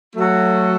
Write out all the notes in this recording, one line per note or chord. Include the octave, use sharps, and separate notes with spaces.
F#3 A3 F#4 A4